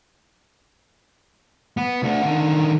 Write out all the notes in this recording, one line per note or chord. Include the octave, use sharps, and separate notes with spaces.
B3
D2 D3
D3 D#3